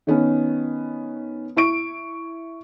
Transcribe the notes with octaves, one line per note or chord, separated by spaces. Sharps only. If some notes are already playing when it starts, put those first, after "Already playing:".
D#3 B3 C#4
E4 C#6 D7